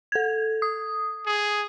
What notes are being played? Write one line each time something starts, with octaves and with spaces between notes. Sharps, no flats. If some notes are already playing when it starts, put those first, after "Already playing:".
A4 G#6
D#6
G#4